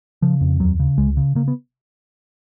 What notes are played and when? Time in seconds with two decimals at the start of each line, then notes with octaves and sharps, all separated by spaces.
0.22 C#3 F3
0.41 F2
0.60 D#2 F#3
0.80 C#3
0.98 C#2 G#3
1.17 C#3
1.35 C#3 A#3
1.48 B3